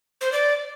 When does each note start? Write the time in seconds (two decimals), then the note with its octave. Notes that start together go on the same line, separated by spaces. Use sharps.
0.21 C5
0.32 D5